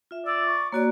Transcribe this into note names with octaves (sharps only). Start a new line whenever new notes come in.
F4 E5
D5 E6
C#6
A#3 F#4 C#5 D5